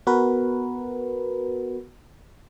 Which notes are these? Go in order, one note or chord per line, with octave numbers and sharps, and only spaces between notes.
B3 F#4 A#4 B4